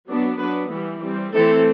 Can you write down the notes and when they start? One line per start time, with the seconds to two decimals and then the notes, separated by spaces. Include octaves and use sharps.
0.08 F#3 B3 D4
0.39 F#3 B3 D4 B4
0.71 E3 G3 B3
1.03 G3 C4
1.34 E3 A3 C4 A4